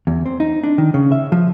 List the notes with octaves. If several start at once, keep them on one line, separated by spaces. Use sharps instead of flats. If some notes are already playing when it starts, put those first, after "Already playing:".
E2
C4
D#4
D4
D#3
C#3
E5
F3